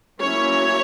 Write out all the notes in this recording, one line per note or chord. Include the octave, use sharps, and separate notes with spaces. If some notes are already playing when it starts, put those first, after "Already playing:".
F#3 A#3 C#4 E4 C#5